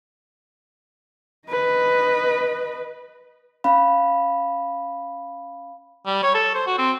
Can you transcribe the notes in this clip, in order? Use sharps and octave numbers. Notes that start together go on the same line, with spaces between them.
B4 D#5
C#4 F5 B5
G3
C#5
A4
C5
F#4
C4